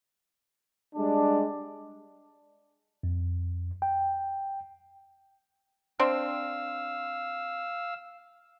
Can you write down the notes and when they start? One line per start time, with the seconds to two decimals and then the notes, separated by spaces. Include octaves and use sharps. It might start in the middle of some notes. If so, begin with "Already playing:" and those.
0.96 G3 G#3 D4
3.03 F2
3.82 G5
6.00 C4 D4 F5 E6